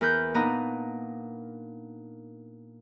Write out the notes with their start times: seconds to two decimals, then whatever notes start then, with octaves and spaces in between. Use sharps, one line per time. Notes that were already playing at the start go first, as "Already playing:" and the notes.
0.01 E2 A#4 B4 G6
0.34 A#2 B3 D4 D#4 B4 A#5